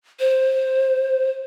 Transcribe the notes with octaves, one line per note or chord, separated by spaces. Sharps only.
C5